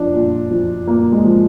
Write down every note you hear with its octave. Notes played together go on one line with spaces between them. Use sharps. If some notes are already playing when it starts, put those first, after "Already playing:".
Already playing: F3 D4
A#2
F3
A#2 A#3
G#3
F3